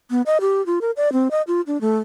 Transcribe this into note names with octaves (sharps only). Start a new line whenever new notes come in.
B3
D#5
G4
F4
A#4
D5
C4
D#5
F4
D4
A3